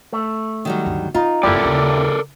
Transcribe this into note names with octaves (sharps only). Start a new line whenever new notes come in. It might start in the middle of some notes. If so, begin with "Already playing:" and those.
A3
D#3 F#3 G3
D2 G2
C4 D#4 F4
F#1 E2 A#3 E4 G4 A4 A#4 D5
D#1 C#3